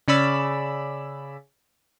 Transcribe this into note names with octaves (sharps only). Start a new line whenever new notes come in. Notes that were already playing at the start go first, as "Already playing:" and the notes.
C#3 C#4 D5 B5 E6